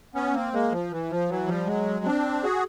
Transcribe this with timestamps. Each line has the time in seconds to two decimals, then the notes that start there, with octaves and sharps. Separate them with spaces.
0.14 B3 C#4
0.34 A#3 C4
0.53 G#3 A#3
0.72 F3
0.91 E3
1.10 F3
1.29 E3 F#3
1.48 F3 G3
1.67 F#3 G#3
2.05 C4 D4
2.43 F#4 G#4